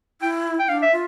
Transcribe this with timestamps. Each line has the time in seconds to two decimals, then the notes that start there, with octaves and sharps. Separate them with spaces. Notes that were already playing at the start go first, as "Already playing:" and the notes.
0.22 E4 G5
0.59 G5
0.68 D4 F5
0.82 E5
0.92 F4